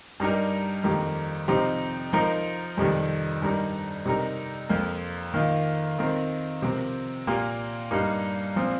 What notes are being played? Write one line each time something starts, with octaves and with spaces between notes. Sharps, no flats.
G2 G3 D#4 G4 A#4
F2 D#3 A#3 D#4 G4
C3 F3 C4 D#4 G4
F3 D#4 A#4
F2 C3 D#3 G3
G2 G3 D#4 A#4
C3 G3 D#4 A#4
F2 F3 A#3
D#3 A#3 F4
D#3 C4 F4 A#4
C3 F3 C4 G4 A#4
A#2 A#3 G4 A#4
G2 G3 A#3 D#4
A#2 F3 C4 F4